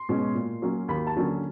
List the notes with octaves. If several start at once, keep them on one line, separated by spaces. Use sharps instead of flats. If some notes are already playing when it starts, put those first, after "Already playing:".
Already playing: C6
B2 G#3 C#4
A#2
F#3 A#3 C#4
D#2 B5
A5
D3 F#3 A#3 C#4